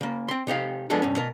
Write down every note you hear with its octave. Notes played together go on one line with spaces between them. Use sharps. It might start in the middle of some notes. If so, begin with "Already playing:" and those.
C#3 A#3
C4 C6
C3 D#4 G4 F5
F3 G#3 B3 D4 G#4 A4
C2 G2 C#4
B2 A#4